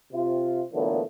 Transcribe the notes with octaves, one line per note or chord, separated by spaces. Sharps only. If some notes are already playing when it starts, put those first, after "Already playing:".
C3 F4
A#2 D3 E3 F#3 A3 B3